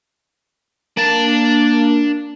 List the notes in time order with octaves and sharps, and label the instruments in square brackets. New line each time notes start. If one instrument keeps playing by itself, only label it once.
[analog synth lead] A#3 [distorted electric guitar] D4 A5